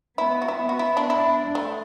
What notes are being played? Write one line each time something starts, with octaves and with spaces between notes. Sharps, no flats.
B3 E4
F#4
E4
B3 F#4
E4
D4
D4 E4
A3